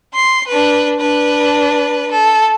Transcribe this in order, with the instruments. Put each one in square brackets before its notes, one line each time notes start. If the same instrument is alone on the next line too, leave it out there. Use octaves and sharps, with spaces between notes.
[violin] C6 C7
D4 B4
D4 B4
A4